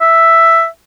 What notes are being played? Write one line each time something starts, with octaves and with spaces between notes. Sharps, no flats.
E5